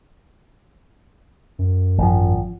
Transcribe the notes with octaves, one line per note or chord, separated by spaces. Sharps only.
F#2
G#1 F3